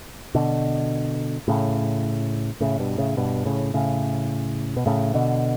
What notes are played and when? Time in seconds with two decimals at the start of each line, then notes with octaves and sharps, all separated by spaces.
0.35 B2 D3
1.48 A2 C#3
2.61 A2 C#3
2.79 G2 B2
2.98 A2 C#3
3.17 G2 B2
3.45 A2 C#3
3.74 A2 C#3
4.76 B2
4.86 A2 C#3
5.14 B2 D3